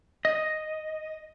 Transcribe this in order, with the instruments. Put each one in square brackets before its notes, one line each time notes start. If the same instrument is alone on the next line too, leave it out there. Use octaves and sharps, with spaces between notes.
[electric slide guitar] D#5